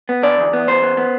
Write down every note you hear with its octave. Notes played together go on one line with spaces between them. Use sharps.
B3
D3 D5
E2
B3
E2 C5
B3
B3